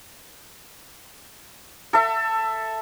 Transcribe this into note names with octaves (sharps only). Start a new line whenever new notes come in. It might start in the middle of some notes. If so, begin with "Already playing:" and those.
A4 E5